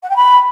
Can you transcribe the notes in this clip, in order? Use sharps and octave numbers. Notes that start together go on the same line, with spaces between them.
F#5
G5
B5